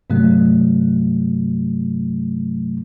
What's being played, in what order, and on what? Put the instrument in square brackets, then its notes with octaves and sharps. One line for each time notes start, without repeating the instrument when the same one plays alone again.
[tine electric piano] G2 C3 F#3 A3